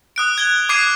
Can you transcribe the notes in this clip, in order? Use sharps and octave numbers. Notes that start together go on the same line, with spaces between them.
D#6 F#6 D7
G#6 G7
D6 D#6 G#6 C7 D#7